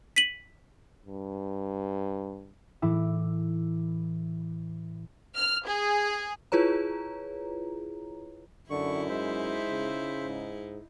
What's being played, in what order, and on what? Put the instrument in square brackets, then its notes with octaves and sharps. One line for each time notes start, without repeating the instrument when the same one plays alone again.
[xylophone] B6 D#7 F#7
[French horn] G2
[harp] A2 E3 E4 D6
[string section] F6
G#4
[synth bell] E4 F4 G#4 B4 C#5 A#5
[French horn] F#2 [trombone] D3 [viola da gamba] D#4 E4 [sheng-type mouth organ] C#6
[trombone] G#3 [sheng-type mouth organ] C5 E5
[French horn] C#3
[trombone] G#2